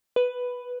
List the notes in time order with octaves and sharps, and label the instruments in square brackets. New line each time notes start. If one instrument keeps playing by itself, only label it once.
[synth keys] B4